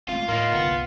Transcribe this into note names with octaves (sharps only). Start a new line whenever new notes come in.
G#3 A3 C4 F4
A2 A#3 D#4 F4
F#1 C2 D3 B3